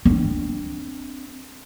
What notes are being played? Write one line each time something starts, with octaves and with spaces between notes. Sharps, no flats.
C4 D4